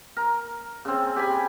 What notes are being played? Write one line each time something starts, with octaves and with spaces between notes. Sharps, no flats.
A#4
C#3 C4
G4 G#5 B5